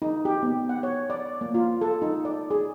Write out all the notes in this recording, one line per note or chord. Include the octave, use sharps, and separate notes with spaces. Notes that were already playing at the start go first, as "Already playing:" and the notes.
D#4
G4
B3
F#5
C#5
D5
A#3
F4
A4
D#4
D5
G#4